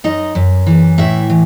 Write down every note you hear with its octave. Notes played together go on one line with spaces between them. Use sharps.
F#2 D#4 D#5
F#2
E3
A2 E4 E5
E3